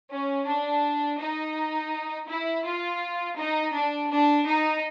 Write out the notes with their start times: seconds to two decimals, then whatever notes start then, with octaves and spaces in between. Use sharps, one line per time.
0.11 C#4
0.48 D4
1.20 D#4
2.29 E4
2.66 F4
3.39 D#4
3.74 D4
4.11 D4
4.47 D#4